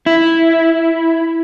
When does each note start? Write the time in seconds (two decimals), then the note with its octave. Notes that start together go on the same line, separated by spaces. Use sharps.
0.06 E4